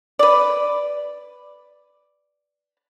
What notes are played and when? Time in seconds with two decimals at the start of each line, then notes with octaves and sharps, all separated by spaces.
0.19 B4 D5